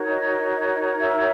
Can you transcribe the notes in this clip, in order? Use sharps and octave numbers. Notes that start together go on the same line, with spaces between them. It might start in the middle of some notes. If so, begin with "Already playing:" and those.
Already playing: D#4 F#4 A#4 C#5
D#5
E5